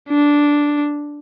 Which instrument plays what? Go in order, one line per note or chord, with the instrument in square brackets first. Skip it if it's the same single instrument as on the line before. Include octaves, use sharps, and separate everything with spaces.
[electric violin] D4